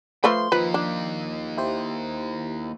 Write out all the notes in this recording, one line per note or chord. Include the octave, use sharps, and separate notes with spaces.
F3 A3 B4 C6
D#3 F3 A#3 F4 B4
D4
E4 G4 C5